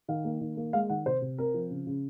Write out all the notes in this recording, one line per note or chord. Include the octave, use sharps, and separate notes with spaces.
D#3 F5
A#3
D#3
A#3
G#3 F5
D#3 F#5
C3 C5
C3
C4 A#4
F3
C#3
C#3